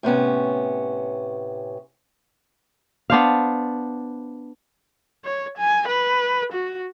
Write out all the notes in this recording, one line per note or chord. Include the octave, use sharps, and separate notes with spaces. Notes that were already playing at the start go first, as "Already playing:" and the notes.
A2 C3 B3 C#4
B3 D4 C5 F5
C#5
G#5
B4
F#4